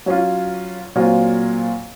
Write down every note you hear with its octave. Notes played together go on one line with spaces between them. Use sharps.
F#3 C#4 F4
A#2 F#3 C4 F4